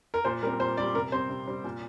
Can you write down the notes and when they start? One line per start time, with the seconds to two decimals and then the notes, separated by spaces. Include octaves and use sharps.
0.14 A#4
0.25 A#2 C5
0.42 G3 A#4
0.47 C4
0.60 A#2 C5
0.77 G3 C4 D5
0.95 C3 A#4
1.12 G3 C4 C5
1.30 C3
1.48 G3 C4
1.64 A#2